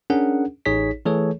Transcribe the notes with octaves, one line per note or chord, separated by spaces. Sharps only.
C#4 D4 G#4 A#4 F#5
A1 D#4 G#4 C#5 B6
E3 A3 G#4 A4 C#5